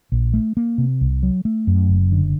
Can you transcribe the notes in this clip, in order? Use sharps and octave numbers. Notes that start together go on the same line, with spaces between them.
A#1
A3
A#3
C3
C2
F#3
A3
F#2
F#1
D3